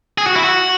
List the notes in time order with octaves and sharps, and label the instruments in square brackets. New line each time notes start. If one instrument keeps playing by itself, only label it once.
[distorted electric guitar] G#4
F#4
E4
F#4